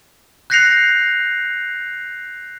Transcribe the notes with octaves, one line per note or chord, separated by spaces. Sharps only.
F#6 G6 A#6 C7 C#7 F7